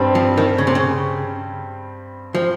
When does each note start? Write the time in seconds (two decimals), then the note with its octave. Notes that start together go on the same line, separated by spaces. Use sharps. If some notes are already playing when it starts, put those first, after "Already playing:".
Already playing: G2 G3 C4
0.15 F3
0.38 D#3
0.58 C#3
0.67 C3
0.75 C#3
2.35 F3